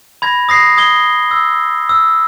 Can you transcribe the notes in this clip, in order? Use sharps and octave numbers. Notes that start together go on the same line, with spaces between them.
B5 G#6 A#6
D#6 A#6 C7
D#6 G#6 G7
E6
E6